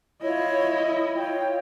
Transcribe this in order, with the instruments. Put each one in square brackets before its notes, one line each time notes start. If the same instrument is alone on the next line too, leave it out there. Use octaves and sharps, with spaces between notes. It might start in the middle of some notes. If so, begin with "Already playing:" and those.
[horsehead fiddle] E4 D#5 [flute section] F4 C#5
[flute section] F4 C#5 G5